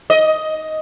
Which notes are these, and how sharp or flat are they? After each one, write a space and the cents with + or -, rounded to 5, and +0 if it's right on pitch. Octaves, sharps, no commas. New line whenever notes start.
D#5 +10